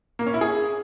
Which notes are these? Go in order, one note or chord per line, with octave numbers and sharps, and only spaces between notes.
A#3
C#4
E4
G#4